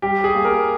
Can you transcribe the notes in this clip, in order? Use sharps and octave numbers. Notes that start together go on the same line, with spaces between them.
G3 G4
G#4
A#3
A#4